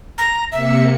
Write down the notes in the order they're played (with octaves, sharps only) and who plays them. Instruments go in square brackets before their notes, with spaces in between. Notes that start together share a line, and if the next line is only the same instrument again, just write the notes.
[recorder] A#5
[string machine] C3 A#3 C#7 [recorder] E5